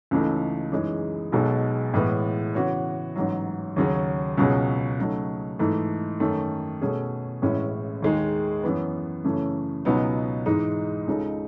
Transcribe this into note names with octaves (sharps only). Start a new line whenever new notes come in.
C#2 C#3 E3 A3 D#4
F#2 E3 G#3 D#4 G#4
B1 B2 G#3 D#4 A4
A2 E3 G#3 B3
C#3 E3 B3 F#4 C#5
A1 G#2 F#3
D#2 C#3 F#3 C#4 G#4
C#2 B2 F#3 C#4 G#4
C#3 F#3 A3 D#4
G#2 E3 A3 D#4
F#2 D#3 A3
B2 A3 C#4 G#4
A1 A2 G#3 C#4 E4
D#2 D#3 G#3 D#4 G#4
F#2 E3 B3
F#2 C#3 E3 A3 C#4
C#2 B2 F#3 B3 D#4
G#2 E3 G#3 D#4
C#2 C#3 G#3 D#4 A4